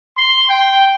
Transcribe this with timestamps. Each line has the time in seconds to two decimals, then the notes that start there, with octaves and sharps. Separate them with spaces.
0.17 C6
0.49 G5